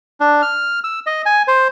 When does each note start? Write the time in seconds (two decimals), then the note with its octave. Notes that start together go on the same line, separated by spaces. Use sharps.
0.20 D4
0.42 F6
0.84 E6
1.06 D#5
1.26 G#5
1.48 C5